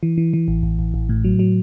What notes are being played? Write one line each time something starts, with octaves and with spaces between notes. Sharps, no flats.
E3
E3
E3
A1
A1
A1
A1
A2
F#3
F#3